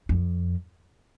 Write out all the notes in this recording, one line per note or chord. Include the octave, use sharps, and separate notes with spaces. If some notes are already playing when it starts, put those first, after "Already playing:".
F2